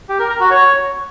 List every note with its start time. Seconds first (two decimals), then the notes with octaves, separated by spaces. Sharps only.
0.09 G4
0.19 A#4
0.30 A#5
0.40 F#4
0.51 C#5